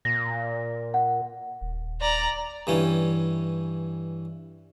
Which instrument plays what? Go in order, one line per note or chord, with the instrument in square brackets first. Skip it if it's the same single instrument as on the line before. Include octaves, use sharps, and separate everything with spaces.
[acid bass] A#2 [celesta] A#6
[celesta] F#5
[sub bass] D#1
[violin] D5 A#5
[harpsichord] G2 E3 C#4